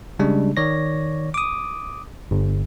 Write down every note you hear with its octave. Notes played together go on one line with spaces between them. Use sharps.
C#3 G3 G#3 D4
D#3 C#5 D5 A#6
D6 D#6
G1